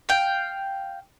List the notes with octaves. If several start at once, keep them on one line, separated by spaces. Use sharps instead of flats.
F5 G5